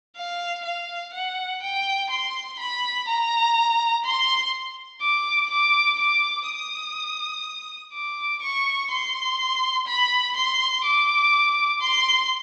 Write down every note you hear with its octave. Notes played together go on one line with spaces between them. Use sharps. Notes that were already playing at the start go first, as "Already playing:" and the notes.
F5
F5
F#5
G5
C6
B5
A#5
C6
D6
D6
D6
D#6
D6
C#6
C6
B5
C6
D6
C6